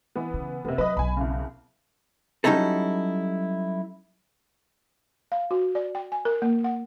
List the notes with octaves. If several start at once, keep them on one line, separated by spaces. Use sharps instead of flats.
E3 B3
C#3
F1 C3 A#3 B3
F#3 B4 D#5
B1 F#3 G#5 B5
C2 C#3
F#3 G3 C#4 D#4 E4 A4
F5
F#4
D5
G5
G#5
A#4
A#3
F#5